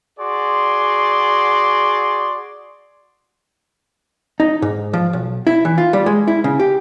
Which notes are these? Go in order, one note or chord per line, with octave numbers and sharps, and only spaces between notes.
F#4 G#4 D5 C6
D#4
G#2
F3
B1
E4
E3
F4
G3
G#3
E4
C#3
G4